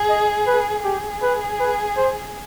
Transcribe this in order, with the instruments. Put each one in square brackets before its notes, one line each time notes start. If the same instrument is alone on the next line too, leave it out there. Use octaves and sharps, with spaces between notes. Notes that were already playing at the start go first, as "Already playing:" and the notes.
Already playing: [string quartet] G#4
[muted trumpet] D#5
B4
[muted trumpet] G4 [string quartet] G#4
[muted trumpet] B4
B4
C5